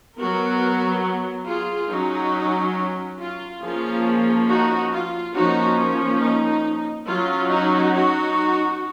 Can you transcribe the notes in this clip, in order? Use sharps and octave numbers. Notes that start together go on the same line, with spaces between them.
F#3 B3 F#4 A#4
F4 G#4
F#3 C#4 D#4 F#4
F4
F3 A#3 C#4 F4 G#4
D#4 F#4
F4
F3 A#3 C#4 D#4 F#4
D#4
F#3 C#4 F4
D#4 F#4
D#4 F#4